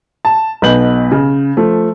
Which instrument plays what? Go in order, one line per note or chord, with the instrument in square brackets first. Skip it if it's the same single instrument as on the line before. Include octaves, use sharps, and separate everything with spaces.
[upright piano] A5
B1 B2 B4 G6 F#7
C#3
F3 A3